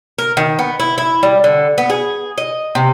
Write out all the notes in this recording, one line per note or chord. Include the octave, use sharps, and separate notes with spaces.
A#4
D#3
B3
E4
E4
G3
D3
B3
G#4
D#5
C3